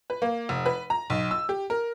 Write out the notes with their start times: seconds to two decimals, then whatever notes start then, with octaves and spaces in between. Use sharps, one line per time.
0.10 B4
0.22 A#3
0.49 F1
0.66 B4
0.90 A#5
1.10 B1
1.31 E6
1.49 G4
1.70 A#4